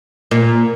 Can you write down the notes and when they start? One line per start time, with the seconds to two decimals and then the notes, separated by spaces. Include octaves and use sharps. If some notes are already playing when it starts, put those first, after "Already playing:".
0.31 A#2